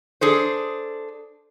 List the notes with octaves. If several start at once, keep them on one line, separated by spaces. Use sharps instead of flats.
D4 G#4 A4 C5